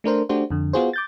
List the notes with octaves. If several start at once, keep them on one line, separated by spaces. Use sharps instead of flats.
A3 D4 A#4 C5
A3 D4 F#4 G4 C5
F2 D3
B3 F4 F#4 G#4 C5
D6 G6 A6